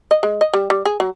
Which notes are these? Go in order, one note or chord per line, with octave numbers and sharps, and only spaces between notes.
D#5
G#3
D#5
G3
G3
G#4
F#3